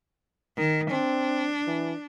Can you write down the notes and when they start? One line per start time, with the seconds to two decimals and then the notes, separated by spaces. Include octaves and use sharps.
0.57 D#3
0.91 C4 D4
1.67 E3